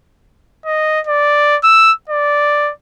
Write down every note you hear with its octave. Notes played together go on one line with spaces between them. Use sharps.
D#5
D5
E6
D5